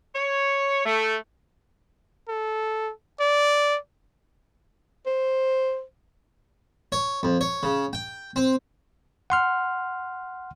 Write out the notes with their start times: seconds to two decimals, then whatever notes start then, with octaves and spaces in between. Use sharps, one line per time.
0.15 C#5
0.86 A3
2.28 A4
3.20 D5
5.06 C5
6.92 C#5
7.23 F2
7.41 C#5
7.63 C#3
7.93 G5
8.36 C4
9.30 F#5 C6 F6